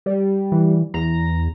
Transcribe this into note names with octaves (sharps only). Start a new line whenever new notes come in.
G3
E3
E2 A#5